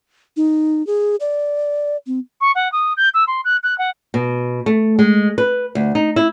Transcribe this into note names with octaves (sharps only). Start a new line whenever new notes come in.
D#4
G#4
D5
C4
C#6
F#5
D#6
G6
E6
C6
F#6
F#6
F#5
B2
A3
G#3
B4
D2
D#4
E4